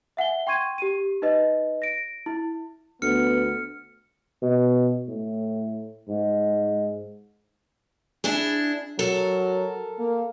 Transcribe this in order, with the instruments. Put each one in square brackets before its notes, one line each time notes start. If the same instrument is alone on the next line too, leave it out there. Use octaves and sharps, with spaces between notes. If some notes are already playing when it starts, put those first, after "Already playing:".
[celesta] E5 F#5 G#5 G7
G5 C6 C#6 G#6 D#7
G4 D#7
D#4 B4 D#5
A#6 D7
E4
[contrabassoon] D2 [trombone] B3 [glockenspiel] F6 C#7
[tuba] B2
A2
G#2
[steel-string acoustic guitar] D4 E4 G#4
[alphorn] F#3 [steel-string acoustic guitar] A4 A#4
[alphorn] A#3